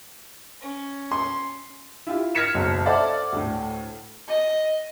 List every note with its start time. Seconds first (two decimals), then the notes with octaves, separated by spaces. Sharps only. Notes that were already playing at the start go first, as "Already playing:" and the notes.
0.60 C#4
1.11 C6
2.07 E4 F4 G4
2.35 F6 G#6 A#6 B6 C#7 E7
2.54 F#1 B1 F#2
2.85 A4 C5 D5 E5 F#5
3.33 D2 A2
4.28 D#5